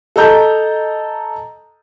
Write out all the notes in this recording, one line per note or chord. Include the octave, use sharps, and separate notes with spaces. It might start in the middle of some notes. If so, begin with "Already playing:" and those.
A4 D#5 A#5 G6